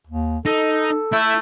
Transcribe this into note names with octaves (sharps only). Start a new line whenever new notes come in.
D#2
D#4 A4
A3 E4